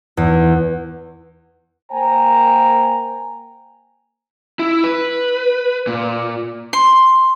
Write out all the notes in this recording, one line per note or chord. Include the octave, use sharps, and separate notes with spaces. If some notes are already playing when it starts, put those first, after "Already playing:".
E2
A#3 C5 G5 G#5 A#5
E4
B4
A#2
C6